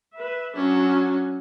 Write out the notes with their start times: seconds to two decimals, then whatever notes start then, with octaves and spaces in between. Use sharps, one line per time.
0.14 B4 E5
0.56 F#3 C#4 D4